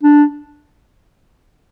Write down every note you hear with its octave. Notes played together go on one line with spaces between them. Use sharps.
D4